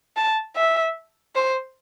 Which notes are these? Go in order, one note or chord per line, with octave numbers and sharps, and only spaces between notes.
A5
E5
C5